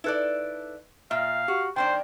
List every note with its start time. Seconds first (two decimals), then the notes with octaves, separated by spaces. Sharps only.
0.04 D#4 E4 A4 B4 D5 F#6
1.11 A#2 E5 F5
1.48 F#4 G4
1.76 D#3 A#3 D4 C5 G5